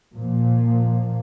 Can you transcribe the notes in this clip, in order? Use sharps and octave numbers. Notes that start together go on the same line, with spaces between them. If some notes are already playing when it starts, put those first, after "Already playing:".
A#2 F3 A#3